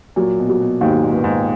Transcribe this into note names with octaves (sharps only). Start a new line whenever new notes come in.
A#2 F#3
B2
F#3
B2
D#2 G#2
A#2
B3
G#2